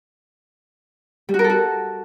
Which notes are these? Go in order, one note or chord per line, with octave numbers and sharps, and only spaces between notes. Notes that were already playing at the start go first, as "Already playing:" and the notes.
G3
F#4
A#4
A4
F#4